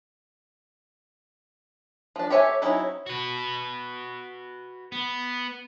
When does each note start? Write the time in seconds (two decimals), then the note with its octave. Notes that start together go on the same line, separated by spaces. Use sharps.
2.16 F3 D4
2.30 G4 A4 C#5 E5 G#5
2.62 F#3 C4 C#4 D#4 E4
3.06 F#4 B4
4.92 B3